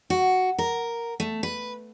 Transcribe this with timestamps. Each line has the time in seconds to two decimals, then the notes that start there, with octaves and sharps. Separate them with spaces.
0.10 F#4
0.58 A#4
1.20 A3
1.43 B4